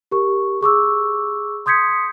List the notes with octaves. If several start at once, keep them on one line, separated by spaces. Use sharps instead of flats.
G4 A#4 C#6
G#4 C#6 D6 E6
C6 D#6 G6 G#6 B6 C#7